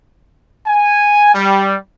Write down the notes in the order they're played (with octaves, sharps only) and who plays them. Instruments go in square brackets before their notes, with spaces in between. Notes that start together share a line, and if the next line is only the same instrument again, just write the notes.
[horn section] G#5
G3